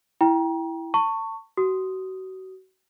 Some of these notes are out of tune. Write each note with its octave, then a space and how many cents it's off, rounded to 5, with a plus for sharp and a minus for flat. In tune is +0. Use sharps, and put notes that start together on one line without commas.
E4 +0 G5 +0 A#5 +30
A5 +30 C#6 +0
F#4 +30 D#6 +0